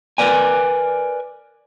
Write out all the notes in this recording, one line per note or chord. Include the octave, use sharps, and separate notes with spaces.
A#4 B4 D5 G#5